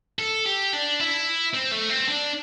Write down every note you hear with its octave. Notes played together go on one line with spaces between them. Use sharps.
A4
G4
D4
E4
C4
A3
C4
D4